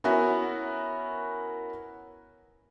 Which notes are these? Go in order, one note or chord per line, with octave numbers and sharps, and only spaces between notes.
B3 C#4 E4 F#4 A#4